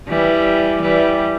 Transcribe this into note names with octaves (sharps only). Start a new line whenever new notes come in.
E3 G3
E3 G3